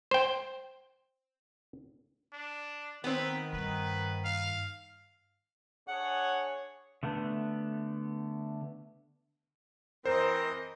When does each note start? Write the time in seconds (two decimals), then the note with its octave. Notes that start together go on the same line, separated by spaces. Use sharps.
0.11 C5 G5
2.33 D4
3.04 D#3 B3 C4 B4
3.53 G2 B4
4.24 F5
5.88 D4 G#4 C#5 F#5
7.03 D3 A3 B3
10.05 E3 C4 A#4 C5 D#5